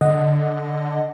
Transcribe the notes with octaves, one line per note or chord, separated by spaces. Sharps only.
D3 D#5 F#5